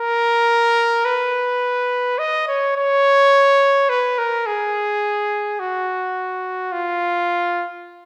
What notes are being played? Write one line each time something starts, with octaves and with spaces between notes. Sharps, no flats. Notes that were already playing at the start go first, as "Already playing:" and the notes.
Already playing: A#4
B4
D#5
C#5
C#5
B4
A#4
G#4
F#4
F4